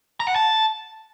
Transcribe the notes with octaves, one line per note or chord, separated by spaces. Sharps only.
A#5
F#5
A5